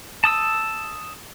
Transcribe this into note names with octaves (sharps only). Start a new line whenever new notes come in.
A5 D#6 E6